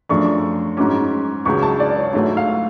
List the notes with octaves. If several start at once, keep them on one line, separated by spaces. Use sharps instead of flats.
F#2 F3 A3 D4 C#6
G#2 F#3 C#4 D6
C#2 C#3 F#3 C#6
A5
D5
C#5
G#2 F#3 A3 C#5
F5